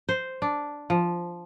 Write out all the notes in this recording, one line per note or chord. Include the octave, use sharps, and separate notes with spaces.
C5
D4
F3